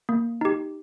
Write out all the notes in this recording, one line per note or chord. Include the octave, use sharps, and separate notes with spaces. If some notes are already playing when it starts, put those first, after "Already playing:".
A#3
D#4 G4